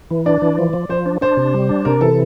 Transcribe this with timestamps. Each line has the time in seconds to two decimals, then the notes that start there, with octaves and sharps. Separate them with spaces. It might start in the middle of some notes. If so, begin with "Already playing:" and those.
0.11 E3
0.26 D4 D5
0.42 E3
0.58 F3
0.73 F3
0.89 F3 C5
1.06 D4
1.21 D4 C5
1.37 C3
1.54 G3
1.69 D4
1.85 C3 A#4
2.01 E3 A4